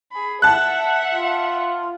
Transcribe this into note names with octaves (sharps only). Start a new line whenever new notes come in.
G#4 B5
E5 F#5 A5 F#6
F4